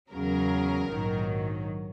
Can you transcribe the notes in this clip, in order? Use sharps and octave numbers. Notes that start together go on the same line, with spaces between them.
E2 C#3 F#3 A#4
A#1 G#2 D#3 F#3